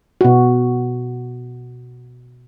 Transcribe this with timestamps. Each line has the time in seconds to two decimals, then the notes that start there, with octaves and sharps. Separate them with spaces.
0.21 B2 F#4